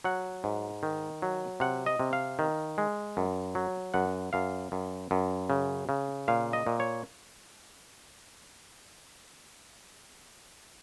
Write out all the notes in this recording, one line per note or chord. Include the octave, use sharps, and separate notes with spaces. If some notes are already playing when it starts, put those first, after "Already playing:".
F#3 F#5
G#2
D#3
F#3
C3 F#5
D#5
C3
F5
D#3
G#3
F#2
F#3
F#2 F#5
F#2 F5
F#2
F#2
C#3
C#3
A#2 F5
D#5
A#2
C#5